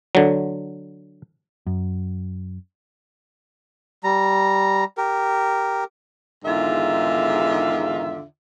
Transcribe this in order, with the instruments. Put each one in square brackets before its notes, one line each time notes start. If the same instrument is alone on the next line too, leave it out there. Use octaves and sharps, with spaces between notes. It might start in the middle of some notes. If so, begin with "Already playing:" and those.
[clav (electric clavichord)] D3 F#3
[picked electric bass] F#2
[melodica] G3 A#5
G4 A#4
[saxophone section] E2 G#2 D3 D#3 F4 E5